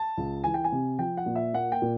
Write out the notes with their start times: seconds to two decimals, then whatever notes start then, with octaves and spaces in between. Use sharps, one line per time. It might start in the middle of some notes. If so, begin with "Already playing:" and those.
Already playing: A5
0.17 C#2
0.44 E3 G#5
0.54 G5
0.64 G#5
0.72 C3
0.99 F3 G5
1.17 F#5
1.26 A#2
1.36 E5
1.53 A#3 F#5
1.72 G5
1.82 A#2